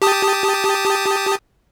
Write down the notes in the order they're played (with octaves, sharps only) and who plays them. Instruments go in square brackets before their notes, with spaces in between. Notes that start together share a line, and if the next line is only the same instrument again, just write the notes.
[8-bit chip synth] G4 A5 D#6